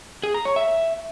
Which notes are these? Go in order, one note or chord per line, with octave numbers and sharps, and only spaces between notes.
G#4
A#5
C#5
E5